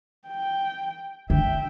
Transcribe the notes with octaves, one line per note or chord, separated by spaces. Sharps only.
G5
D3 E5 G5